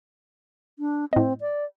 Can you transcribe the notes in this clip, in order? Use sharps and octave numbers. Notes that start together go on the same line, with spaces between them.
D4
A2 C4 D#5
D5